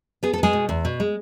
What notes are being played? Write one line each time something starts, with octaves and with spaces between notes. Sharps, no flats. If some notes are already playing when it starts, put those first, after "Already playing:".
B3 G#4
A4
G#3 B3 G#4
B2
E2
B2
G#3